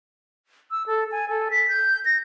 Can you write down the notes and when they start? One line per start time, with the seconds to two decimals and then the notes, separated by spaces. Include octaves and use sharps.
0.71 E6
0.87 A4
1.12 G#5
1.29 A4
1.51 B6
1.69 G6
2.05 A#6